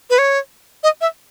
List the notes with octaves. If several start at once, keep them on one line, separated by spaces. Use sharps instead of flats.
B4
C#5
D#5
E5